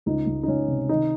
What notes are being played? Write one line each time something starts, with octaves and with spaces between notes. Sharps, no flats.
C#2 D#4
C#2
D#4
C#2 C#4
C3
D#3 D#4